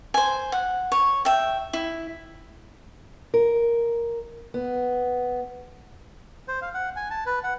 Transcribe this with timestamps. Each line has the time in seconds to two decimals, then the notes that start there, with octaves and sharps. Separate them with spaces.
0.14 C5 G#5
0.52 F#5
0.92 C#5
1.25 E5 G5
1.73 E4
3.34 A#4
4.54 B3
6.48 C5
6.62 F5
6.74 F#5
6.96 G#5
7.10 A5
7.26 B4
7.43 F#5